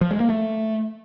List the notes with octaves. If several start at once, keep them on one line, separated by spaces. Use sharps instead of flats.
F3
G#3
A#3
A3